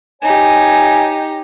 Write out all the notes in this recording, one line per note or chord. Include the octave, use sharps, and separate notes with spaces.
D#4 G4 C#5 G#5